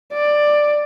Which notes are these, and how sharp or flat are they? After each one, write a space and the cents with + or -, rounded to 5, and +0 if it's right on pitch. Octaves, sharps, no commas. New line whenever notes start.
D5 +10